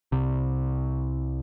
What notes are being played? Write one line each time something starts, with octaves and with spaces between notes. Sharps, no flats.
C2 C3